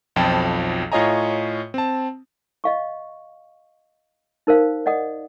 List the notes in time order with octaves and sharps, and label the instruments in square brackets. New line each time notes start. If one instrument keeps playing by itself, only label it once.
[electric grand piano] B1 F2 F3 G5 A5
A2 F4 C#5 D#5 G#5 A#5
C4 A5
[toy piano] D#5 F5 C#6
D#4 A#4 C5 F5
D5 D#5 F#5 D#6